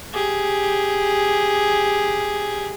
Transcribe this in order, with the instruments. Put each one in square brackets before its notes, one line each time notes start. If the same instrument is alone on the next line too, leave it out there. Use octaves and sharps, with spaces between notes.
[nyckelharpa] G4 G#4